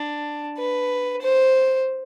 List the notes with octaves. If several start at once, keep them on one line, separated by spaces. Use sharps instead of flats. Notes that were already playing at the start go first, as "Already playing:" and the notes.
Already playing: D4
B4
C5